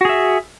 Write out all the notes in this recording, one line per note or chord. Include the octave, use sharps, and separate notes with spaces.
F#4 G#4 E5